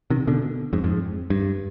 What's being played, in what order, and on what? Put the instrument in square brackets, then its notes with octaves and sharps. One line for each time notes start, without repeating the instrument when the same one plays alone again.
[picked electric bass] C3 D#3
B2 D3
F2 G#2
F2 G#2
G2